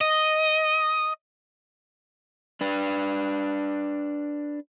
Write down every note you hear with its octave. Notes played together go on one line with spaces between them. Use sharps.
D#5
D4 B4